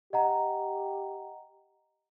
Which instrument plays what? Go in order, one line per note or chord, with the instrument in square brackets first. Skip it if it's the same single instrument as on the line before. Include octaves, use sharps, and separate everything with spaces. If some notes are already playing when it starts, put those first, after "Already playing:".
[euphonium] G4 [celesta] D#5 F#5 A#5